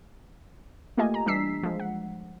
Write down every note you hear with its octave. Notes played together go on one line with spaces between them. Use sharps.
A3 A#3 F4 G4 D#5 G#5
A#5
E3 G3 D4 E6 B6 C7
F3 G#3
F#5